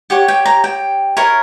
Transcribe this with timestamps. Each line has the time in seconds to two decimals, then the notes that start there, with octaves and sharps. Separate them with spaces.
0.10 G4 C#5 F#5
0.28 G5
0.46 A#5
0.64 G5
1.17 E4 A#4 C#5